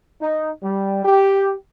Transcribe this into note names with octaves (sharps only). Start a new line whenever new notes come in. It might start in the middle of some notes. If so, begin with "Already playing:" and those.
D#4
G3
G4